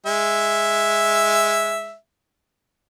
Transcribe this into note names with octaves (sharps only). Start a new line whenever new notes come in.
G#3 E5